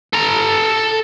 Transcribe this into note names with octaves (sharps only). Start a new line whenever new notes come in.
A4 A#5